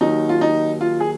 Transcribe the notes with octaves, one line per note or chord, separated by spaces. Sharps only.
D#2 D#3 F#3 D#4
F4
D#4
F4
G#4